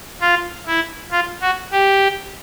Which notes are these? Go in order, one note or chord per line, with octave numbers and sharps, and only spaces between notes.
F4
E4
F4
F#4
G4